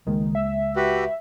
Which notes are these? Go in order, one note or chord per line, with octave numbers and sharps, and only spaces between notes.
C#2 D#3 G#3 A#3
E5
F#4 G4 B4